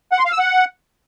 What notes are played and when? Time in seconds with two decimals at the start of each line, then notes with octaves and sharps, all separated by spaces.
0.12 F#5
0.19 C6
0.25 F5
0.32 E6
0.38 F#5